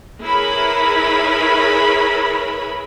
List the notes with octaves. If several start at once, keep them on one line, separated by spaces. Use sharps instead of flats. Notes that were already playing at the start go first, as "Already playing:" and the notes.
E4 G#4 A#4 B4 C#5 B5